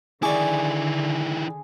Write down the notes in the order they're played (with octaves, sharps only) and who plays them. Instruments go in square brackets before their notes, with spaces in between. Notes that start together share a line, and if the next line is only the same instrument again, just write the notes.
[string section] D3 [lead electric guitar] D#3 E4 [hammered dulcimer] G#4 [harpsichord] D5 C#6 D6